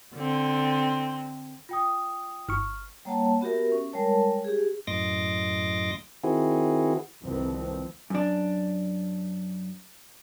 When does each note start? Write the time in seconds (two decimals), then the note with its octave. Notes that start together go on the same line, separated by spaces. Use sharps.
0.15 D3 C4
1.69 F4 G5 D#6
2.49 G1 C#6 F6
3.05 G3 A#3 C#5 F#5 A5
3.41 B3 F#4 G4 A#4 E5
3.72 C#4
3.93 G3 G#3 A#4 C#5 A5
4.44 G4 G#4
4.87 F#2 A2 D#5 C6 D6 A#6
6.23 D#3 C4 E4 F#4 G#4
7.23 C2 F2 D#3 F3 B3 C4
8.10 F#2 D4